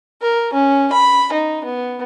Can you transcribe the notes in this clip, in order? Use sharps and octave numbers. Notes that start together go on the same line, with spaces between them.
A#4
C#4
B5
D#4
B3